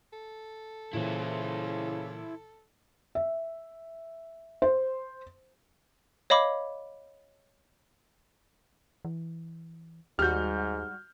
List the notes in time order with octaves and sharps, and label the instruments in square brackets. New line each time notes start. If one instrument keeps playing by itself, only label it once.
[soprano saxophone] A4
[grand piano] A#2 E3 [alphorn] C#3 [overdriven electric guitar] E4 C5
[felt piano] E5
C5
[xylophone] C#5 D#5 F5 B5 D6
[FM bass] E3
[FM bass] D#2 [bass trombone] G#2 [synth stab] G3 F#4 [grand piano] F6 G6